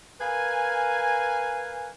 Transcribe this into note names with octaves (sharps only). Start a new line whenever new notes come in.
A#4 B4 F5 G#5